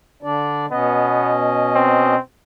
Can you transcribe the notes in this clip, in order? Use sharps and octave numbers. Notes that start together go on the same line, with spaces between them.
D3 D4 D5
B2 B3 C#4 D#5
C4